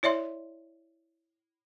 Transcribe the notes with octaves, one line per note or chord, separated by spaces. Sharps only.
E4 C#5 D5 E5 C6